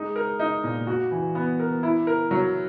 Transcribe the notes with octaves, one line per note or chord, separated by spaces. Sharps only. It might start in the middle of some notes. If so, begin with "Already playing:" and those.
Already playing: G#3 D#4
A#4
D#4
A#2
F#4
E3
B3
A#4
E4
A#4
F#3